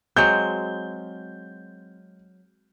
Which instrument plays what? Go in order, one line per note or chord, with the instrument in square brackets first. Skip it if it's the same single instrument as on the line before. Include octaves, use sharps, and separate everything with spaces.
[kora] F#3 G#3 C4 [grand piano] G6